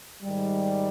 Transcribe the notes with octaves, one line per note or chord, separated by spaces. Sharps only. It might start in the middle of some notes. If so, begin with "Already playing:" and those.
G#2 D#3 G3